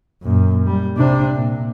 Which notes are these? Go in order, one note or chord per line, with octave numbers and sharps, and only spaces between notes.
F#2 A#2
G3
C3 D4
A#2